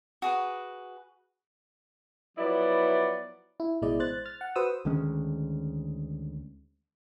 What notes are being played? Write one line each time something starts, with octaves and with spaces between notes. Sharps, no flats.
F#4 G#4 B4
F3 F#3 B3 E4 D5
E4
A1 B2 G#3 E4 D5 D#5
C5 F#6 A6
F6 A6
F#5
F#4 B4 C5 F#5 D#6 E6
D2 D#3 G#3 C#4